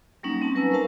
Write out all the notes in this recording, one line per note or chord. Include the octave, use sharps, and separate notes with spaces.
F#3 G3 A#3 C#4 D#4
C4 D#4 A5
F#3 B4 G#5 A#5 C#6 E6
A#4 C5 F5 A5